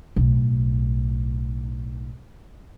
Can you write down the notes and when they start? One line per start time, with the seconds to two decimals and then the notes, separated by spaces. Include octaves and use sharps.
0.16 B1 A2